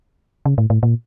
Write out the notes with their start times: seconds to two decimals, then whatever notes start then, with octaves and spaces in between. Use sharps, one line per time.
0.46 C#3
0.58 A2
0.70 A2
0.83 A#2